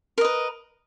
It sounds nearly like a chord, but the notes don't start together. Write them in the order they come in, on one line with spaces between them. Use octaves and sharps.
A#4 D#5 B4